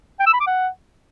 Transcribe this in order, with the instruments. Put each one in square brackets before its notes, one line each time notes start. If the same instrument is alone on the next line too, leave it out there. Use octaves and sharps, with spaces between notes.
[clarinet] G5
E6
B5
D6
F#5